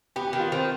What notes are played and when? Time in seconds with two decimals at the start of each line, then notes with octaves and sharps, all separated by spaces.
0.16 B3 G4
0.27 G4
0.33 D#3
0.40 F4
0.52 D#3 C4